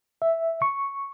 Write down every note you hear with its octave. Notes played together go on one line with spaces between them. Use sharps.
E5
C#6